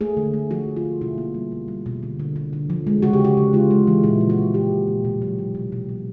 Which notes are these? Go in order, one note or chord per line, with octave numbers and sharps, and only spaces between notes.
A3 G#4
D3
A3
F3 F#4
D3
F4
D3
B2 E4
A#3
G3
B2
G3
B2
D3
D3
D3
D3
F3
G#3
C#3 F#4
G4
C#3
F#4
C#3
G#3 F4
G#3
E3
A#2 E4
F3
F#4
F3
A#3 G4
A#2
A#2
B2
F#3
F#3
B2
B2
F#3